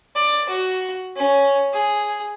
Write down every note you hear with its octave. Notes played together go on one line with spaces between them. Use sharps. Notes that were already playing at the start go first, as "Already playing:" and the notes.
D5
F#4
C#4
G#4